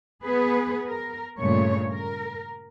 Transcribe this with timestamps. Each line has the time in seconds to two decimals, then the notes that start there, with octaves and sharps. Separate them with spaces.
0.24 B3 G#4 B4
0.87 A#4
1.39 G2 A#2 C#3 A3 C#5
1.92 A#4